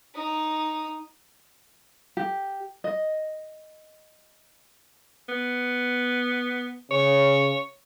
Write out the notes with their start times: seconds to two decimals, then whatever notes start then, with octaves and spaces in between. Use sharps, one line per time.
0.15 D#4 D#6
2.17 G4
2.84 D#5
5.29 B3
6.91 C#3 C#5